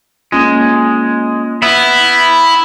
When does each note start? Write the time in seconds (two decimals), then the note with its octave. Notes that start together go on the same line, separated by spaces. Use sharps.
0.32 G#3 A#3 C#4 F4
1.62 B3 E4 E5 B5